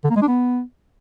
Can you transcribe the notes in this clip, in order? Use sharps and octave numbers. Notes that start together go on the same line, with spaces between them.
D3
A#3
G#3
D4
B3